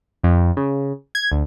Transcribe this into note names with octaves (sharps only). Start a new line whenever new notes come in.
F2
C#3
G#6
D2